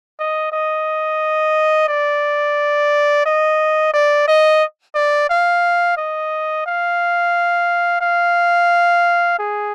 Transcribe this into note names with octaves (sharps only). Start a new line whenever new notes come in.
D#5
D#5
D5
D#5
D5
D#5
D5
F5
D#5
F5
F5
G#4